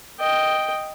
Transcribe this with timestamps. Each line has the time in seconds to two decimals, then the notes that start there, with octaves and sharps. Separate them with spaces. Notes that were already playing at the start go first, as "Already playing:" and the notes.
0.19 D#5 G5